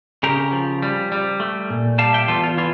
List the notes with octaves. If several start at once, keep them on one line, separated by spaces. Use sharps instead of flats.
C#3 G4 A#4
F3
G3
G3
A3
A#2
G3 F5 A5
E5 G5
E2 F4 A4
F4
E3 F4